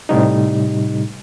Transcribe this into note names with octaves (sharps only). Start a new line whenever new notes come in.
A2 C3 G3 D#4